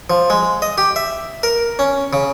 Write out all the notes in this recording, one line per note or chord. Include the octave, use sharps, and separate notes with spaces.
F3
G#3
D#5
G4
E5
A#4
C#4
C#3